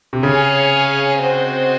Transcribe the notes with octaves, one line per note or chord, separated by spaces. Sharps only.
C3
C#3 C#4 G#4 C#5 F5 G#5
C4 F#4 C5 D#5